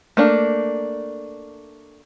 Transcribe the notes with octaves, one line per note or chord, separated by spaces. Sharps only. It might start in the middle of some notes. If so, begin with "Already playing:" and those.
A3 A#3 D4